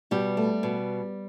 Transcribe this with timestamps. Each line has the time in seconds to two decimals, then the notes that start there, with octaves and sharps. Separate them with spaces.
0.11 B2 G3 G4
0.37 A3
0.63 B2